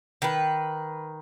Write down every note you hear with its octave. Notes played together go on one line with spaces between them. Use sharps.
D#3 B4